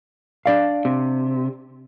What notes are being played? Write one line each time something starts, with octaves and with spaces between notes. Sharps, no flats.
D4 D5 F5
C3